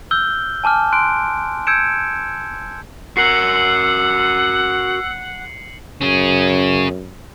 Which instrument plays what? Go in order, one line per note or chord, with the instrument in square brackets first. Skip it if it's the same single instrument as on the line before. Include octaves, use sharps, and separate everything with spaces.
[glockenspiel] E6 F6 G6 G7
G#5 A5 D6 F6
C6 F#6 D7
E6 G6 G#6 C#7 D7 E7
[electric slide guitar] F#4 A#4 [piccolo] F#5 [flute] E6 [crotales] C7 C#7 F#7
[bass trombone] F#2 [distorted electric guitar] C#4 G#4